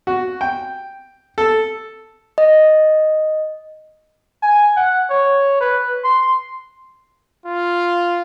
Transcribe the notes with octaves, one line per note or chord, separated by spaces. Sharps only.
F#4
G5
A4
D#5
G#5
F#5
C#5
B4
C6
F4